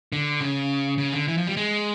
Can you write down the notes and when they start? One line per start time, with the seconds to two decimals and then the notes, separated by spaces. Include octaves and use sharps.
0.12 D3
0.41 C#3
0.98 C#3
1.13 D3
1.28 E3
1.38 F3
1.47 G3
1.57 G#3